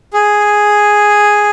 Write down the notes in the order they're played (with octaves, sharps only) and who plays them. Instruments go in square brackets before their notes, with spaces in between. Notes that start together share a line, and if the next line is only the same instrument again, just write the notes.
[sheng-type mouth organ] G#4